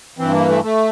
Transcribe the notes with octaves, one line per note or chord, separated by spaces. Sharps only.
G2 E3 C4
A#3
A3
A3